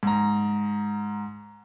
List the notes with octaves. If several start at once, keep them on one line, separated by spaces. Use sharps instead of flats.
G#2 A#5